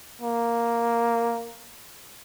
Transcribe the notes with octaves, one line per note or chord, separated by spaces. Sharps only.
A#3